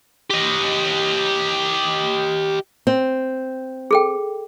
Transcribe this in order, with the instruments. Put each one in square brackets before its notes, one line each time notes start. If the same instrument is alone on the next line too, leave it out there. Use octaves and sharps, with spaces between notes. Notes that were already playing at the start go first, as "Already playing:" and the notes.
[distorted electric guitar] G4 D#5
[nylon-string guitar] C4
[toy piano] G#4 A4 G5